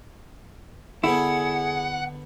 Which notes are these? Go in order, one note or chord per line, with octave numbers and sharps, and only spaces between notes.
D3 B3 E4 G#4 F#5